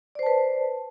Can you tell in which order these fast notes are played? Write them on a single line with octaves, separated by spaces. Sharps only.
D5 C5 A5 B4